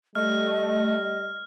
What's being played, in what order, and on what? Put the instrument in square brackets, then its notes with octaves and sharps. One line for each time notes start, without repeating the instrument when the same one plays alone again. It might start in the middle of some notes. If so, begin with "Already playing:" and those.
[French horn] G3 [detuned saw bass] A3 [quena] D#5 [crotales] F6